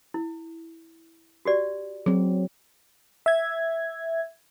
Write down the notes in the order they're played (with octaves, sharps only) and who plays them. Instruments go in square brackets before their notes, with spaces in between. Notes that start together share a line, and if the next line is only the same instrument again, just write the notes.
[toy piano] E4
F#4 G4 D5
[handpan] F#3 C4 [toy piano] G#4
[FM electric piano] E5 G#6